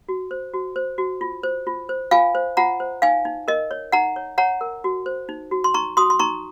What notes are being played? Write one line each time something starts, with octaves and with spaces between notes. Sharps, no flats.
F#4
C5
F#4
C5
F#4
F4
C5
F4
C5
F4 F5 G#5
C5
F4 F#5 A#5
C5
D#4 F5 G#5
D#4
A#4 D#5
C#5
D#4 F#5 A#5
C#5
C#5 F#5 A#5
A#4
F#4
C5
D#4
F#4
C6
D#4 A#5 C#6
F#4 C6 D#6
C6
D#4 A#5 C#6